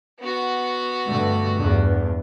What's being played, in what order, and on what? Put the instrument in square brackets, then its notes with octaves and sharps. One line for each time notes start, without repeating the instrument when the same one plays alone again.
[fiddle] B3 F#4
[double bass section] G2 D3 A3
E2 G2